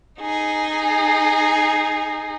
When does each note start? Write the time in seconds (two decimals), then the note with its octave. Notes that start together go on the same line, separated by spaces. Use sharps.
0.21 D#4 G#4